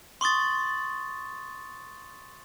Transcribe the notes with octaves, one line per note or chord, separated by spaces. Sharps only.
C6 C#6 D#6 A6